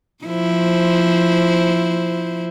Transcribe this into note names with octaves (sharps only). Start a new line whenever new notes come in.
F3 E4 C5